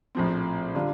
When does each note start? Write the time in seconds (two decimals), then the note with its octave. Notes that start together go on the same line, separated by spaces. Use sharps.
0.15 A#1 A2 F3 C4
0.74 D3 G3 D4 F4